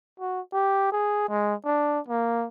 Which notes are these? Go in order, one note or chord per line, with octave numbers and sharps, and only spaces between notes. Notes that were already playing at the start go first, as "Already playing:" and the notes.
F#4
G4
G#4
G#3
D4
A#3